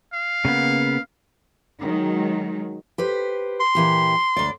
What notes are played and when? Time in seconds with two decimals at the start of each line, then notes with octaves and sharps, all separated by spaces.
0.13 F5
0.45 C#3 A#3 B3
1.81 D#3 F#3 G#3
2.98 G4 B4 C5
3.60 C6
3.75 A#2 E3 G4
4.36 D2 D5